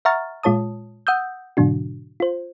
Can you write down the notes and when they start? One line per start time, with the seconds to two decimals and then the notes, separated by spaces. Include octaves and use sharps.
0.05 E5 F#5 A#5 C#6 F6 A6
0.43 A#2 G#3 F4 C#5 A5 D#6
1.07 F#5 D#6 E6 G6
1.57 G#2 B2 D3 F#3 D4 F#4
2.20 F4 C5